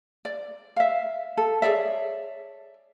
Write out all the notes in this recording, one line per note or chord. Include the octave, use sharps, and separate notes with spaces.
D5
E5 F5
A4
G#4 C#5 D5 E5